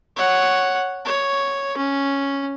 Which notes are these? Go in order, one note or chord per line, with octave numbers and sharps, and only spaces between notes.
C#5 F#5
C#5
C#4